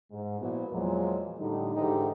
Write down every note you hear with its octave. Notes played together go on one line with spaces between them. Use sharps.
G#2
A#2 F3 B3 E4 F#4
E2 A#2 F3 F#3 G#3
A2 D3 G3 D#4
G#2 D3 E3 D#4 G4